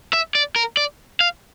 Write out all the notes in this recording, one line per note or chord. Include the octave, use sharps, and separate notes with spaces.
E5
D5
A#4
D5
F5